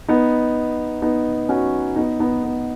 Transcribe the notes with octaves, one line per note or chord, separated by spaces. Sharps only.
B3 D#4
B3 D#4
C#4 F#4
B3 D#4
B3 D#4
B3